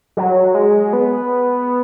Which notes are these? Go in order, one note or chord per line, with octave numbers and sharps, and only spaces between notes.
F#3
G#3
B3